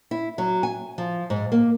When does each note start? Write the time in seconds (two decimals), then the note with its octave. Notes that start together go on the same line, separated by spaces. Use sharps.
0.11 E4
0.38 F#3
0.63 G#5
0.98 F3
1.30 G#2
1.52 A#3